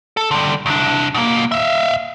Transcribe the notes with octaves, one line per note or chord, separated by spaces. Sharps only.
A4
D3 G3
C2 D4
B2 A#3
E5 F5